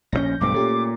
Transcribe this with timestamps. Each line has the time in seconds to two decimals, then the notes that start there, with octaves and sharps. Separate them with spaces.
0.12 A#1 D3 C#4 G6 A#6
0.41 B1 G2 A3 D6
0.54 A#2 A3 C#4 G4